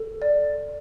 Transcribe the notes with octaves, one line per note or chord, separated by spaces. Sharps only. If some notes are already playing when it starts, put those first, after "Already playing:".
Already playing: A4
D5